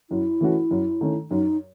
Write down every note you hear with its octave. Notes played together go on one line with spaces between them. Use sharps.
F#2 E4
E3 A3 C#4 F#4
F#2
D#3 A3 C#4
F#2 D#4